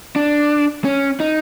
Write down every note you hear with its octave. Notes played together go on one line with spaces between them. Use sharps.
D4
C#4
D#4